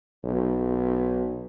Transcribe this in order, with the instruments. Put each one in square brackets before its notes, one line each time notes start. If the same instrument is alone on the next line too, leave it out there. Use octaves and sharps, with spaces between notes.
[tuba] B1